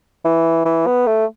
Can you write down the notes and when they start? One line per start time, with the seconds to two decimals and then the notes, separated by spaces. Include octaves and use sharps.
0.24 E3
0.65 E3
0.86 B3
1.07 A3